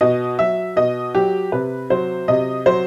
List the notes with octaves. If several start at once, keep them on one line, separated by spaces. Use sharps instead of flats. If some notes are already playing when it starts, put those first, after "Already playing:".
B2 D#5
F#3 E5
B2 D#5
F#3 G4
C3 B4
F#3 C5
C3 D#5
F#3 C5